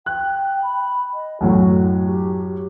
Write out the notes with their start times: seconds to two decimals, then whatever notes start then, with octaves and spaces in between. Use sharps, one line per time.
0.06 G5 F#6
0.62 B5
1.13 D#5
1.41 F#2 A2 F#3 F#4
2.06 G4